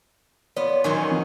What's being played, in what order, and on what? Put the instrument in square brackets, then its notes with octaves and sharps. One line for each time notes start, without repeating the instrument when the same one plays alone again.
[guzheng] B3 F4 [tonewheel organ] C#5 D5
[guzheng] D#3 F#3 C#4 [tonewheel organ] G#5 C6 C#6
[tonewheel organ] E3 F3 C4